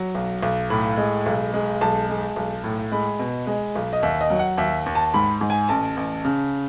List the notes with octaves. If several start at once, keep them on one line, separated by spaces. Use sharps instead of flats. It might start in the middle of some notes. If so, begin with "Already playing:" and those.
Already playing: F#3
B1
B1
A2 B5
G#3
B1
G#3
B1 A5
G#3
B1
A2
G#3 B5
B2
G#3
B1
D#5
D#2 E5
D#5
F#3
F#5
D#2 E5
D#2
A5
G#2 B5
G#2
G#5
A1 A5
A1
C#3